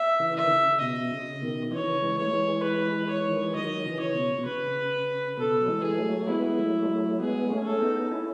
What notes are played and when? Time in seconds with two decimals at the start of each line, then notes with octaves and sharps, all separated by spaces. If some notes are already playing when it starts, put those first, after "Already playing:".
Already playing: E5
0.20 C#3 E3
0.36 E5
0.44 D#3
0.50 C#3
0.80 B2 D#5
1.11 C#3
1.42 B2 D#3
1.72 C#3 E3 C#5
2.02 E3 G#3
2.18 A3 C#5
2.33 E3 G#3
2.63 B4
3.09 C#5
3.27 D#3
3.41 E3
3.55 D#3 F#3 D#5
3.85 C#3 E3
4.00 C#5
4.15 B2
4.39 B2
4.46 C#3 B4
5.37 B2 A4
5.61 F#3
5.68 E3 G#3
5.83 G#4
5.98 F#3 A3
6.29 G#3 B3 E4
6.59 F#3 A3
6.85 G#3
6.90 F#3 A3
7.20 G#3 B3 G#4
7.50 A3 C#4
7.66 A4
7.81 B3 D#4
8.11 C#4 E4